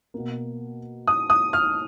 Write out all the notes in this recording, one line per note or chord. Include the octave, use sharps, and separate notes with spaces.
B2 A#3
D#6
D#6
F6